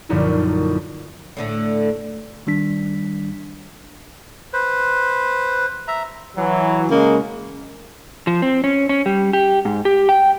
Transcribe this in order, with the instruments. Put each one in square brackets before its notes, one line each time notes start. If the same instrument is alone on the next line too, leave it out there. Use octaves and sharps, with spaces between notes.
[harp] A#1 F#2 A#2 D3 D#4 E4
[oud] A2 D3 A3
[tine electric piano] D#3 G3 D4 B6
[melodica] B4 C5
E5 A#5
[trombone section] E3 F#3
[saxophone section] C#3 G#3 A#3
[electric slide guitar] F3
C4
C#4
C#4
G3
G4
G#2
G4
G5